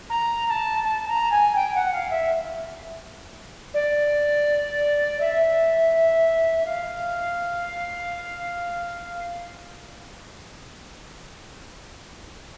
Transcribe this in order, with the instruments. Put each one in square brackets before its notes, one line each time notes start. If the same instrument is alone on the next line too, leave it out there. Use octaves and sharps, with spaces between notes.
[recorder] A#5
A#5
A5
A5
A#5
G#5
G5
F#5
F5
E5
D5
E5
F5